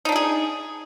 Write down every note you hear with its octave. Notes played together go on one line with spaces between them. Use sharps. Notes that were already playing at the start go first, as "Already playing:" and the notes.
D4 D#4 G4 G#4